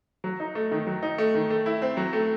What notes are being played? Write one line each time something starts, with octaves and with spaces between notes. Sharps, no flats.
F#3
D#4
A3
D#3
F#3
D#4
A3
D#3
A3
E4
C4
F#3
A3